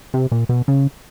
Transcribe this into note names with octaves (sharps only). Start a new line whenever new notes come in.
C3
A#2
B2
C#3